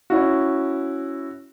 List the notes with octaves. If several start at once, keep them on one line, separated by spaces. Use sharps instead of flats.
C#4 E4 F#4